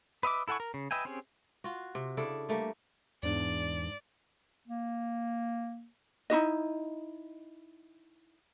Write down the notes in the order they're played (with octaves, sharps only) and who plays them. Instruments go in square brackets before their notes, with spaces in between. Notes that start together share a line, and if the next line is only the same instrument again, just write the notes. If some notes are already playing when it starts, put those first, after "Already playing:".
[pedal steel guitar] B4 D#5 E5 D6
E4 A4 F#5 G#5 C#6
A#4
C#3
B4 D#5 E5 G5 G#5
C4 C#4 G4 G#4
[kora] F4 F#4
C3
C#3 D4 E4 A4
G3 A3 A#3
[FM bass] E2 [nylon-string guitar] G#2 D4 [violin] D5
[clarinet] A#3
[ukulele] D#4 E4 F#4 D#5